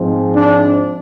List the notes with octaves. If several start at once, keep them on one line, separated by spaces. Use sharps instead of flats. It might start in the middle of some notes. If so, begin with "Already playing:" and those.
Already playing: G#2 F3 G#3 C4
D4